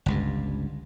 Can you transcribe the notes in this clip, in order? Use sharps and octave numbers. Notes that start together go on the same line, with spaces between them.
G1 C#2 G2